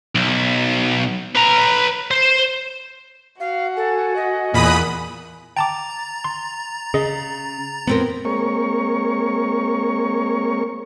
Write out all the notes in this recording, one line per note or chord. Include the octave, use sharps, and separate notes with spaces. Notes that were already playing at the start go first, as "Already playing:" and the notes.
B1
B4 A#5
C5
F#4 F5
A4 G#5
D#5
E2 A#2 B5 D#6 F#6
G5 A5 A#5 D6 A6
C6
C#3 G#4 D#5
F2 B3 C4 A#4
G#3 A#3 C4 A#4 C#5 C#6